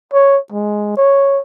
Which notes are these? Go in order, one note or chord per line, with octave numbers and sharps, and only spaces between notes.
C#5
G#3
C#5